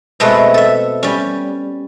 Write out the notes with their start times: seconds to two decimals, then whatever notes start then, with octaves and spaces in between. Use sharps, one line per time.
0.20 B2 G#3 A3 C4 A4 B4
0.54 A4 E5
1.03 G3 C#4